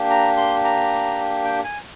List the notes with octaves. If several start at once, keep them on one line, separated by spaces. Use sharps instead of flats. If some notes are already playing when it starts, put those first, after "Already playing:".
Already playing: A#3 D4 G4
A#5
C6
A#5
G5
G#5